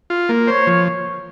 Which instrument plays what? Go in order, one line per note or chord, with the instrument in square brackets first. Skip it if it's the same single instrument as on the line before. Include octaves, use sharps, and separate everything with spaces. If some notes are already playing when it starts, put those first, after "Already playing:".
[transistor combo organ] F4
A#3
[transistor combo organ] C5 [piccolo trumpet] C#5
[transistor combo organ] F3